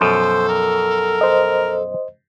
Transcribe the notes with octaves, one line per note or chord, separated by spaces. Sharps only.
F#2 B2 F3 A4 C5
A#4
C5 D#5